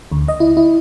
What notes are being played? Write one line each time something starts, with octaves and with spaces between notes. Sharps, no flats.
D2
D#5
E4
E4